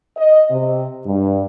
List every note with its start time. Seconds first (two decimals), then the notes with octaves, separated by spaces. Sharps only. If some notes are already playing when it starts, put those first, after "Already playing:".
0.16 D#5
0.50 C3
1.05 G2